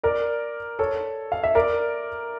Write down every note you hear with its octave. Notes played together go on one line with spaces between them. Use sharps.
A#4 D5
A4 C#5
F5
E5
A#4 D5